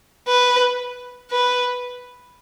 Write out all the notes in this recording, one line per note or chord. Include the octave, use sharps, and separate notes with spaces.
B4
B4